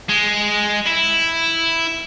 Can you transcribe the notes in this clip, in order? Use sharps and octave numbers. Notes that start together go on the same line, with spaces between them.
G#3
E4